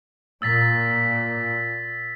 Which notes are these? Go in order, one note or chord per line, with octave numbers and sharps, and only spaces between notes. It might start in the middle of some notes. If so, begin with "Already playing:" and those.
A#2 E6 A6 B6